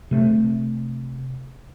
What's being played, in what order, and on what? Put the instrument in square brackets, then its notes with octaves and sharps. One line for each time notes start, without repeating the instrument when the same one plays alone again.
[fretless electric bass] C3 A3